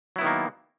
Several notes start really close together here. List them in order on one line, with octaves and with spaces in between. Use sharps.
F#3 E4 B3 D#3 A#3